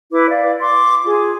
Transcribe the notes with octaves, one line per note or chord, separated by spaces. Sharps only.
E4 B4 D6
D5 F5
C6 D6
F4 G#4